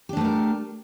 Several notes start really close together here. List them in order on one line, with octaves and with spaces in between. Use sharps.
G4 D4 A3 B4 A#4